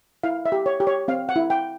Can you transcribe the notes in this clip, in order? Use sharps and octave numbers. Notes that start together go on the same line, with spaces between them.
E4 F5
E5
G4
C#5
G4
C#5
C4 F5
F#5
E4
G5